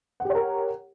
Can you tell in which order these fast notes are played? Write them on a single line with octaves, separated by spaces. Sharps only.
F#5 G4 C#5 A#4